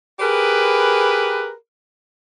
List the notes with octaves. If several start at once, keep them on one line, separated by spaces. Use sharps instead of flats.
G4 G#4 A#4 B4